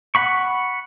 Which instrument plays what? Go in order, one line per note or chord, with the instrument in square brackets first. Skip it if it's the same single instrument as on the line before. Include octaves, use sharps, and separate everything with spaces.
[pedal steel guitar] F#5 B5 C#6